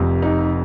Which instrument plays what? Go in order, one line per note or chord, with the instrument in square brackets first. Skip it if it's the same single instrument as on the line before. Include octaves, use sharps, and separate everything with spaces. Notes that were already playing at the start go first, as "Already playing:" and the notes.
Already playing: [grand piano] F1 F2 C3
D#4